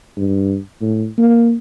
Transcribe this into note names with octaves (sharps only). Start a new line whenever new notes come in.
G2
A2
A#3